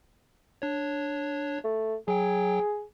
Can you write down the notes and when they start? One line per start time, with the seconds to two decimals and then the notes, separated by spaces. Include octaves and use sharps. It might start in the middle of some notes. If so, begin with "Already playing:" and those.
0.62 D4 C#5
1.64 A3
2.08 F#3 G#4 G5